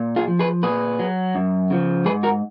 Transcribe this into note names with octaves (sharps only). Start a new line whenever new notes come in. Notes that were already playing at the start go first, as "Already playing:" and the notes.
Already playing: A#2
F4 G#4
F3
G#4 B4
A#2 G#4 B4
F#3
F#2
C#3 F3
G#2 G#4 B4
F#4 A#4